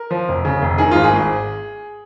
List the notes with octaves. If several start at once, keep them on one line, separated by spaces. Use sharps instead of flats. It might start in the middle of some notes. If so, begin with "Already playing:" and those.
Already playing: A#4
F3
F1
C#3
F1
D#3 G#4
G#1 F4
G#4
G#1